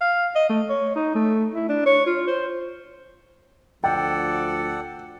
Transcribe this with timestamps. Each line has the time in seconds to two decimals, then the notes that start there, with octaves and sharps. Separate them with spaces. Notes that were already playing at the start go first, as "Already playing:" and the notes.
0.01 F5
0.35 D#5
0.49 A3
0.69 C#5
0.95 D#4
1.15 A3
1.55 E4
1.69 D4
1.86 C#5
2.06 F4
2.27 C5
3.84 D2 F3 A4 D5 F#5 G5